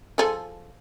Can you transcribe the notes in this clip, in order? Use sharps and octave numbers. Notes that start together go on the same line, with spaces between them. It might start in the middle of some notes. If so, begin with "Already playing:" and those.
F3 G#4 A4